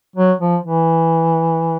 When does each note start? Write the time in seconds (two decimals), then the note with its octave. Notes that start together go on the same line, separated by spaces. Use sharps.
0.16 F#3
0.40 F3
0.63 E3